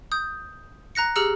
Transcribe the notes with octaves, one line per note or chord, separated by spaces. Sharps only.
D#6 G6
A#5 F#6 A#6 C#7
G4 G#4 A#5 E6 F6 C#7